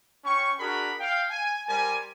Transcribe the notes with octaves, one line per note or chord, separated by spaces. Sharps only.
C#4 G5 C#6
D4 F#4 G#4 A#4 B5
F5 G5
G#5
G3 A#4 C5 G#5